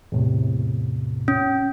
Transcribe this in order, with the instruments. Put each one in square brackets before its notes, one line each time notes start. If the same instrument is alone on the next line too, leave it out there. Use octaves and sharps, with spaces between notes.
[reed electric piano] E2 A2 C3
[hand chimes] C#4